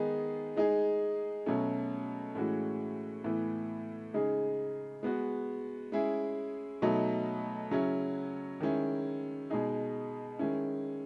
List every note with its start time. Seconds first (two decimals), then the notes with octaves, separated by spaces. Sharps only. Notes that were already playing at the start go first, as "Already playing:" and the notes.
Already playing: D#3 G#3 B3 D#4 G#4
0.57 G#3 D#4 G#4
1.46 B2 F#3 A3 C#4
2.35 A2 E3 G#3 C#4 F#4
3.24 A2 E3 B3
4.14 C#3 G#3 D#4 G#4
5.03 G#3 B3 F#4
5.92 G#3 C#4 E4 G#4
6.82 B2 F#3 A3 D#4
7.71 C#3 F#3 C#4 E4
8.60 D#3 G#3 C#4 E4
9.50 B2 G#3 D#4 G#4
10.39 D#3 G#3 C#4 E4